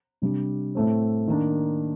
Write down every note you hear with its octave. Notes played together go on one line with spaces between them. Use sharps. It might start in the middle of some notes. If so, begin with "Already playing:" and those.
C3 G3 D4
A2 A3 C4
D#3 A#3 D4